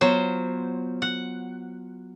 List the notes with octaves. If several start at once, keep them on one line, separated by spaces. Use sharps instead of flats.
F#3 B3 F4 C5
F#5